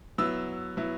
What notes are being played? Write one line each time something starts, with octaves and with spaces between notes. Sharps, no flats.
F#3 B3 E4 E6
F#3 B3 E4